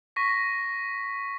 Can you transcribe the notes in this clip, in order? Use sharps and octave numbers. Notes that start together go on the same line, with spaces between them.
C#6 A#6 B6